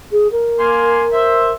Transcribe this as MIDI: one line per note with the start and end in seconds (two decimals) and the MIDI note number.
0.11 0.30 68
0.31 1.52 70
0.59 1.05 58
0.59 1.05 80
0.59 1.05 84
1.13 1.53 72
1.13 1.53 76